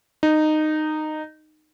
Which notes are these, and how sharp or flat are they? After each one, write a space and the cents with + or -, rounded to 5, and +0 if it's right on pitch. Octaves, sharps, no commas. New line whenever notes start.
D#4 -15